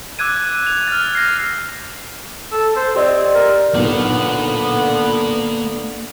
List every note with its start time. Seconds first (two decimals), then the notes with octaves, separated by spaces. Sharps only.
0.19 D6 E6 F#6 G#6 D#7
0.67 F7
0.87 F6 A6
1.15 G6 A#6 C7
2.52 A4
2.76 C5
2.96 C4 G4 D5 D#5
3.35 A#4
3.74 B1 A#2 D3 A#3 B3 D5